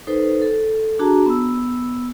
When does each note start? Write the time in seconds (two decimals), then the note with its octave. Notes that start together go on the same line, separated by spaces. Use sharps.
0.07 D#4 A4 B4 C5
0.42 A4
0.99 D4 F#4 G#4 A5 A#5
1.26 B3 E6